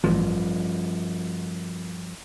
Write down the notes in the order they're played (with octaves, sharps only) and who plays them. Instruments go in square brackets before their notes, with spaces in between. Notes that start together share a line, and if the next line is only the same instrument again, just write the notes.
[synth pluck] A1 [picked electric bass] G2 F3